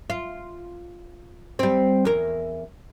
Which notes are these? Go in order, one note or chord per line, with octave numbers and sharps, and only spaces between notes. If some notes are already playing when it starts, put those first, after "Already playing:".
F4
G3 C4
E2 A#4